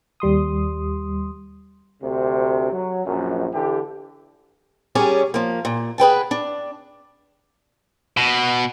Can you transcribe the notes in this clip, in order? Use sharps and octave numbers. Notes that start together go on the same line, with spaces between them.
D#2 G3 C6 D#6
D2 C3
F#3
A#1 F#2
D3 E3 G4
G3 C#4 G#4 A#4 C#5 D5
F3 A#3
A#2
G#4 B4 G5 A5
D4
B2